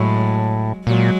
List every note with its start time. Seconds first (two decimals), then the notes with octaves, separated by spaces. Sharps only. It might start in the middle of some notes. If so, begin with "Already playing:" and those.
Already playing: A2 F#3 G#3
0.86 A#2 F#3 G#3